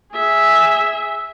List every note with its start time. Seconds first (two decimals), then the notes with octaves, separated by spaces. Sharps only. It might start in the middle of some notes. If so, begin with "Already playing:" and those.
0.12 G#4 E5